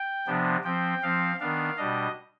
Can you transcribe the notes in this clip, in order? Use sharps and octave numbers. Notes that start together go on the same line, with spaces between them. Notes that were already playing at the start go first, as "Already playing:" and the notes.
Already playing: G5
C3 F3 B3 D4
F3 C4 G5
F3 C4 F5
D#3 B3 D4 F5
B2 G3 D4 D#5